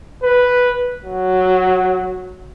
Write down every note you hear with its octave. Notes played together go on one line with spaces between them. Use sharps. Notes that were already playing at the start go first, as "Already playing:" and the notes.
B4
F#3